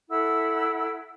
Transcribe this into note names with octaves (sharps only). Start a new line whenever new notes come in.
E4 A4 F#5 E6